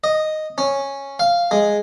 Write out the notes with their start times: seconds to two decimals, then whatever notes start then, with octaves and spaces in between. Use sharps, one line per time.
0.04 D#5
0.58 C#4
1.19 F5
1.51 G#3